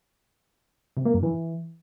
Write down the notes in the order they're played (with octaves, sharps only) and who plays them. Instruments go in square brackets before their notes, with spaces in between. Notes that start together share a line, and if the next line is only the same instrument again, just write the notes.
[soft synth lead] C3
A#3
F#2
E3